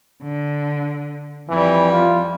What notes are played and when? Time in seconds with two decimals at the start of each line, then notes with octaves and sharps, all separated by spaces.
0.22 D3
1.49 F2 E3 G3
1.92 F4